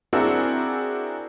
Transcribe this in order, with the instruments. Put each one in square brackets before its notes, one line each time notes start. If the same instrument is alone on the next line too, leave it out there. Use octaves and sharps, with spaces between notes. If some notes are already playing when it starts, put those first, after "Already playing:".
[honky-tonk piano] C4 D4 E4 F#4 G#4 A#4